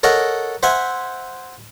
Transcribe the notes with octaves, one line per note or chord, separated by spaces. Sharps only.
A4 A#4 C#5 D#5 F#5
C5 E5 F#5 G#5